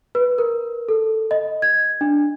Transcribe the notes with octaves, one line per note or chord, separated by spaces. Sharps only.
B4
A#4
A4
D#5
G#6
D4